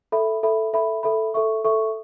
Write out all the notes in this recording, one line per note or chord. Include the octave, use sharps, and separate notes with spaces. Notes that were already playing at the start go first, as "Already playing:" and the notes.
A4 E5 B5
A4 E5 B5
A4 E5 B5
A4 E5 B5
A4 E5 C#6
A4 E5 C#6